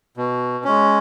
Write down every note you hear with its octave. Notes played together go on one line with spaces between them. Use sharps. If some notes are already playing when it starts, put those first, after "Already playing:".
B2
G#3 C#4